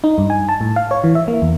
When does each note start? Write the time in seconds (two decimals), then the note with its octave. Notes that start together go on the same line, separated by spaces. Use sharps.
0.04 D#4
0.18 G2
0.30 G#5
0.49 A5
0.61 A2
0.76 F5
0.91 C#5
1.04 E3
1.15 E5
1.28 A#3
1.42 E2